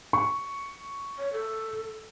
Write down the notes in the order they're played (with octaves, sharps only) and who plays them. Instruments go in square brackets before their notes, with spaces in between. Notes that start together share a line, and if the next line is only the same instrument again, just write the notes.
[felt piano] C#6
[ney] C#5
A4